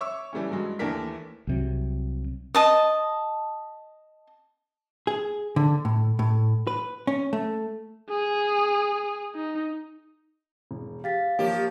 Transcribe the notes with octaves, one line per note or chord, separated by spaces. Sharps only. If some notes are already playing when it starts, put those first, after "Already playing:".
C#5 E5 C#6 D6 E6
E3 G3 A3 C#4
G2 F#3 G#3
D#2 E3 A3 D4 A#4 B6
C2 C3 F#3
D#5 A5 D#6
G#4
D3
A2
A2
B4
C#4
A3
G#4
D#4
E1
G4 F5 A6 B6
F3 A#3 G4 C#5